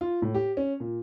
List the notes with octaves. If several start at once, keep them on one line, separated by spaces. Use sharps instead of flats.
F4
A2
G4
C#4
A#2